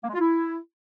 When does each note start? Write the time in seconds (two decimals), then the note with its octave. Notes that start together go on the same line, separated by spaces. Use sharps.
0.03 A#3
0.09 G#3
0.14 F4
0.20 E4